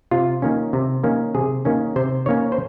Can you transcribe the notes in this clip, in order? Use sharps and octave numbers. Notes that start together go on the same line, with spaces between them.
C3 F4
D#3 A#3 C#4
C3
D#3 A#3 C#4
C3 G#4
D#3 A#3 C#4
C3 C5
D#3 A#3 C#4 C#5
C5